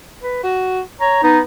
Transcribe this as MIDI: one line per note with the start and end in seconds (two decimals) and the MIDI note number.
0.23 0.43 71
0.43 0.80 66
1.00 1.19 73
1.00 1.21 82
1.23 1.42 59
1.23 1.39 63